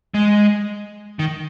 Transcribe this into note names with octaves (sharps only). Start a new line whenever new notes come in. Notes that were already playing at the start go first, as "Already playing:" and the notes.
G#3
D#3